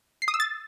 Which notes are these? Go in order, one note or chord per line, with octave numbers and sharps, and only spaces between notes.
C7
D#6
E6
A6